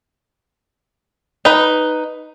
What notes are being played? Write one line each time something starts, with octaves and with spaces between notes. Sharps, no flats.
D#4 B4